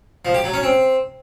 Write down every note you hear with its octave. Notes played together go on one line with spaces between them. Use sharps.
F3
G4
F#3
C#4
C4